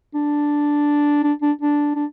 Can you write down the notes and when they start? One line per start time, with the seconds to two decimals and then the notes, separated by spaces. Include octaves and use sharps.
0.14 D4
1.23 D4
1.42 D4
1.62 D4
1.95 D4